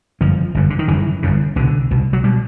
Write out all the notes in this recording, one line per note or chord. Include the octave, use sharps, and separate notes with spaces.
G1 F#2 C#3 F3
G1 F#2 C#3
D3
D#3
G1 F#2 C#3 E3
G1 F#2 C#3
C2 B2 D3
C2 B2
F#3
B2 G3